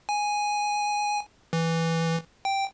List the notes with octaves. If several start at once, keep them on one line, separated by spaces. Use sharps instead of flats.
G#5
E3
G5